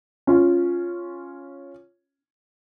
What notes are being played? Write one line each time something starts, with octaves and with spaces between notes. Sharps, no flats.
C#4 F4